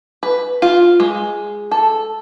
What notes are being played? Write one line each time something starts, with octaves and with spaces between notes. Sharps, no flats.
B4
F4
G#3
A4